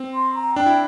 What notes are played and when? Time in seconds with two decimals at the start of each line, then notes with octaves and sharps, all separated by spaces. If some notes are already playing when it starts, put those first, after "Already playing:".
Already playing: C4
0.14 C6
0.35 A#5
0.56 D4 G5
0.66 E4